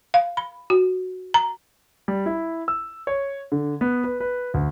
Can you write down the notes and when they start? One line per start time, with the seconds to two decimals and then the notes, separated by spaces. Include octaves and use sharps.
0.14 F5
0.37 B5
0.70 F#4
1.34 A#5
2.08 G3
2.26 E4
2.68 E6
3.07 C#5
3.52 D3
3.81 B3
4.04 B4
4.20 B4
4.54 D2